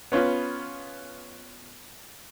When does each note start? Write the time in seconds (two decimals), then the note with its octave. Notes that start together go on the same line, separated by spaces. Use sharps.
0.12 B3 C#4 F4 B4